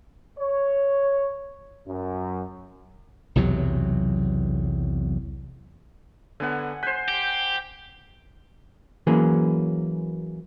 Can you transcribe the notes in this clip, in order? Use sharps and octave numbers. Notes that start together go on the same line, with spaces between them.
C#5
F#2
B1 E2 C3 F#3
D3 B3 F#5 G#5
C5 G#5 F#6 G6 B6
G4
E3 F#3 A#3 C#4 G#4